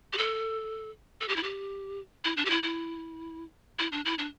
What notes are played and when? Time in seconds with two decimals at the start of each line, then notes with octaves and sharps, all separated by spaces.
0.13 G4
0.18 A4
1.21 A4
1.28 G4
1.36 E4
1.43 G4
2.24 E4
2.37 D4
2.45 G4
2.50 E4
2.63 E4
3.79 E4
3.92 D4
4.05 E4
4.18 D4